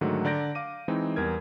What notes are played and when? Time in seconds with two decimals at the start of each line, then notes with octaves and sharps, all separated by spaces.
0.01 G#2 D3 D#3 F#3 A3
0.25 D3 D5 A#5 G6 A#6 D7
0.55 F5 D6 D#7
0.88 E3 G#3 C4 D#4
1.16 E2 G3 A#4 G#6